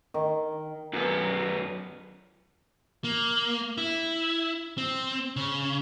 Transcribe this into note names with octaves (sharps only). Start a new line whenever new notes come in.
D#3
F#2 B3
A#3
E4
C4
C#3